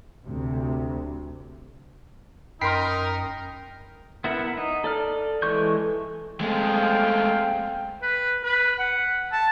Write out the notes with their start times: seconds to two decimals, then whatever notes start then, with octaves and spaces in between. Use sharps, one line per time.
0.25 D2 C3
2.61 F#2 D#4 A#4 G5 B5 C6 B6 C7
4.24 B3 E4 A#4 E5 F#5
4.57 D#4
4.84 A4 D5 F6
5.42 E3 G#3 A4 C#6 G6
6.41 G#3 A3 C4 F5 G5
8.02 B4
8.43 B4
8.79 F#5
9.32 A5